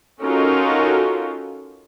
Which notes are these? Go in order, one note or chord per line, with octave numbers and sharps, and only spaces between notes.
C#4 D#4 F4 F#4 A4 A#4